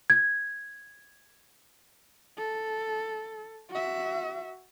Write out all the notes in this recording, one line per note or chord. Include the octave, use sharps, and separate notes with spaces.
G#6
A4
F#4 E5